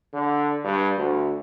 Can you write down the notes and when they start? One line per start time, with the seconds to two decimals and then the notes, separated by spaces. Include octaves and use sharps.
0.14 D3
0.64 G2
0.97 D2